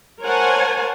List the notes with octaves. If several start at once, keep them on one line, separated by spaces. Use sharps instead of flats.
A#4 C5 C#5 F#5 G#5 A5